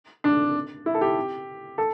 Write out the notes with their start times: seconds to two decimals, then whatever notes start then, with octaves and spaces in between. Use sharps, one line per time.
0.24 D4
0.86 E4
0.94 A4
1.01 G4
1.78 A4